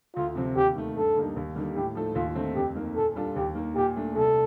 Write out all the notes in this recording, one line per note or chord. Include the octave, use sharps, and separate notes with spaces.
D2 F4
C3 F3 C4
D#2 G4
D#3 A3
G2 A4
D3 G3 A#3 D#4
D#2
D3 G3 A#3 D#4
A2 G4
F3 A3 D#4 A4
D#2 F4
D3 A3 C4 D#4
F2 G4
D#3 A#3
A#2 A4
G3 D4 F4 A4
D#2 G4
D#3 A#3
A#2 G4
A3 D4
C2 A4